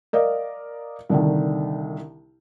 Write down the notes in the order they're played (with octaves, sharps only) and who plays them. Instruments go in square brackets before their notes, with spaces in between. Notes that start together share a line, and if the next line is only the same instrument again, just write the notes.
[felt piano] A#4 D5 D#5 F5
C2 D3 D#3